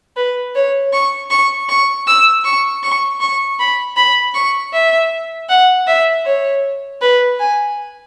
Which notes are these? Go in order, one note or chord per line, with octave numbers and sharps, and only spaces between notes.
B4
C#5
C#6
C#6
C#6
E6
C#6
C#6
C#6
B5
B5
C#6
E5
F#5
E5
C#5
B4
G#5